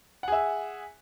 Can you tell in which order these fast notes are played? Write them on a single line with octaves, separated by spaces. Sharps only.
F#5 G#4 E5